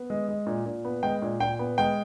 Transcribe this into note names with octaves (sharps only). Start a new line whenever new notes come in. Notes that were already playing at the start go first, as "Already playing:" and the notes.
Already playing: B3
G#3
G#3
A#2
A#2
B3
G#3 G5
A#2
A#2 G5
B3
G#3 G5